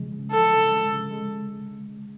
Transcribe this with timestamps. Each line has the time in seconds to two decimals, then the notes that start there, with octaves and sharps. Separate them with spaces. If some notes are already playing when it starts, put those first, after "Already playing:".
Already playing: C#3 F3 G#3
0.12 C#3
0.31 F3 A4
0.51 C#3
0.72 G#3
0.91 C#3
1.11 G#3